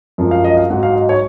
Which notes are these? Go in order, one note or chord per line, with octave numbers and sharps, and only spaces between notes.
F#2 F3 G#3
F5
D#5
F5
G#2 F#3 F#5
F5
D#5
C#5